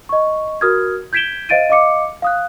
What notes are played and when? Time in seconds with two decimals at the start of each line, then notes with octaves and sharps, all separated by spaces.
0.09 D#5 C#6
0.61 F#4 A#4 D#6 F6 G#6
1.13 G6 G#6 B6 D7 E7 G7
1.49 C5 D#5 F5 A6 D7 D#7
1.70 D#5 F5 D6 C#7
2.22 F5 D#6 F#6